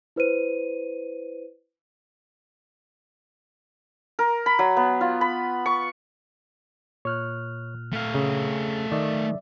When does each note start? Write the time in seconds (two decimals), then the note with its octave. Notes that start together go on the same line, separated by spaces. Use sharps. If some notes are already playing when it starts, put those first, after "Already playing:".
0.16 E4 B4 C5 D#7
4.19 A#4
4.46 B5
4.59 F#3
4.77 B3
5.01 F4
5.21 B5
5.66 C#6
7.05 A#2 C#5 F6 F#6
7.93 A3 F5
8.14 C#3
8.92 D#3 D5 E5